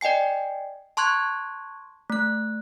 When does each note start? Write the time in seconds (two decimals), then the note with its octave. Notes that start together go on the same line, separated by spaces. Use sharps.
0.01 D5 D#5 G5 G#5 C7
0.97 A5 C6 C#6 F#6 G#6
2.10 A3 F#6